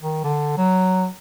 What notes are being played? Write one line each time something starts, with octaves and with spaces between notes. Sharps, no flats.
D#3
D3
F#3